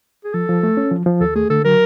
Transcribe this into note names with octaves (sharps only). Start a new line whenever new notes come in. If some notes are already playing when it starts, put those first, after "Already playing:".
G#4
F3 A4
F3
A3
C#4
F3
F3
D#2 A4
A3 G#4
D3 A4
F#3 A#4